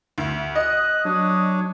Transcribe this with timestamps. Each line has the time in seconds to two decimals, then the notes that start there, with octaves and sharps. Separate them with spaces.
0.18 D2
0.55 D#5 F#6
1.05 F#3 D4 C#5 D#6